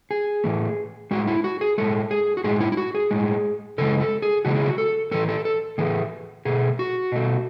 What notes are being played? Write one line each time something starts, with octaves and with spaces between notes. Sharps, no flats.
G#4
A2 E3 A3
A2 G#3 F#4
E4
F#4
G#4
A2 G#3 A4
G#4
F#4
A2 G#3 G#4
E4
E4
F#4
G#4
A2 G#3
C#3 E3 G#3 A4
A4
G#4
C#3 E3 G#3 F#4
G#4
F#4
A4
A2 E3 A3 A4
A4
A4
A2 E3 A3 G#4
B2 A3 G#4
F#4
B2 A3